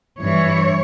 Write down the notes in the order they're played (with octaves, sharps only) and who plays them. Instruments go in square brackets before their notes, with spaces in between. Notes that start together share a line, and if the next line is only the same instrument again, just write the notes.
[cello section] G2 E3 C#5